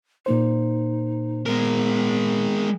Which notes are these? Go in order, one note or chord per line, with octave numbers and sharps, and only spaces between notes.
A#2 A#3 D#4 C5
G#3 B3 A#4